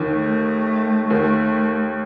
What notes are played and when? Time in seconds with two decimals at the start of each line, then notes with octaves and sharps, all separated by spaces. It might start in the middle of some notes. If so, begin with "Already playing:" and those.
Already playing: D#2 D#3
0.13 A3
1.10 D#2 D#3 A3